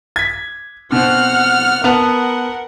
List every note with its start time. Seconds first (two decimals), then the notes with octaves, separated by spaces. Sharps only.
0.16 G#6 B6
0.92 B2 C4 F#5 F6
1.84 B3 A#4 F#5 A5 F7